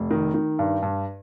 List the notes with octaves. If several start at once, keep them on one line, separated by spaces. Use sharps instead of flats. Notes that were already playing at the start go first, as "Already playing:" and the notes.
Already playing: F1
D#3
D#3
G2
G2